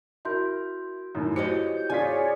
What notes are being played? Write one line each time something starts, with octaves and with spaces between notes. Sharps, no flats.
E4 F#4 A#4 C6 G6
F#2 A2 D#4
E4 F#4 G4 C5 C#5 D#5 C#7
G6
C3 F4 G#4 C#5 D5 G#5 B6